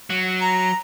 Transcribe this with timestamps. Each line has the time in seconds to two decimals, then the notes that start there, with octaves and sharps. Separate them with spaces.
0.10 F#3
0.41 A#5